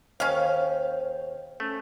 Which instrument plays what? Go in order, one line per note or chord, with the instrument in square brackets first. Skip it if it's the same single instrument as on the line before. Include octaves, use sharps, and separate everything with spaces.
[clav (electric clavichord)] D#2 [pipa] C#4 F5 [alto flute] C5
[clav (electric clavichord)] A3 [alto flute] C#4